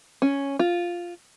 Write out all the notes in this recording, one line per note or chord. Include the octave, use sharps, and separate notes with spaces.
C#4
F4